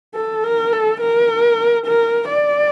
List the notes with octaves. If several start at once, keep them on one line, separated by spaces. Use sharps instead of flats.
A4
A#4
A4
A#4
A#4
D5